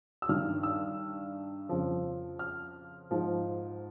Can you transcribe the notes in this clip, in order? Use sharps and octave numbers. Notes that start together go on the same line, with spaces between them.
E6
G2 D#3 F6
E6
F2 C#3 F3
F6
G#2 F3